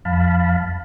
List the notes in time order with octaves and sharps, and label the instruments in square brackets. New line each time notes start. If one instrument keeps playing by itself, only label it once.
[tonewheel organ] F2 F5 A5 B5